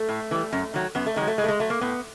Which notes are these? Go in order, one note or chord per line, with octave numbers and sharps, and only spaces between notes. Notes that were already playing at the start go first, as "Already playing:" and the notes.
Already playing: A3
A2
E3 G3
F#2
D#3 F#3
F#2 B3
A3
D#3 F#3 G#3
A3
A2 G#3
A3
G#3
F#3 A3
A#3
A2 B3